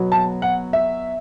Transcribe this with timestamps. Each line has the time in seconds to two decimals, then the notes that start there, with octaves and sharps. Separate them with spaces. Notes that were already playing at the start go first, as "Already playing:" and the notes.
Already playing: B2 F#3 B3
0.12 A5
0.42 F#5
0.73 E5